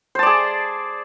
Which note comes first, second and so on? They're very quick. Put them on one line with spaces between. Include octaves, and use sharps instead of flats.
C5 A5 D5 G#4